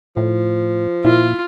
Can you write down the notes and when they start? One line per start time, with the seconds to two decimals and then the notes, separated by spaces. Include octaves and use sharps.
0.17 A2 F3
1.05 A#2 E4 F4